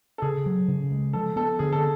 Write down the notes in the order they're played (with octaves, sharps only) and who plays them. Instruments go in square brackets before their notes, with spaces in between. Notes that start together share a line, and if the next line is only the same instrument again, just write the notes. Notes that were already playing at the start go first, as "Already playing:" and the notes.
[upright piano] A4
[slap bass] C#3 [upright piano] G#4
[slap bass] F#3
C#3
G#3
[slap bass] F3 [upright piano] A4
[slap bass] B3 [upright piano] A4
[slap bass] D3 [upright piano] G#4
[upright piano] A4